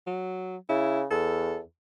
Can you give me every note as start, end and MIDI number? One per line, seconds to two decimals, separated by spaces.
0.07 0.57 54
0.69 1.05 49
0.69 1.01 64
1.11 1.61 40
1.11 1.59 69